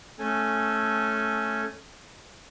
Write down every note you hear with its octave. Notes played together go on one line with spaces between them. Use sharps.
A3 C#4 A4 G#5